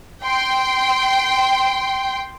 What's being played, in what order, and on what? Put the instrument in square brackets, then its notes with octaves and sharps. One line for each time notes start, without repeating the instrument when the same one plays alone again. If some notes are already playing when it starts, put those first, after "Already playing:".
[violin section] G5 C6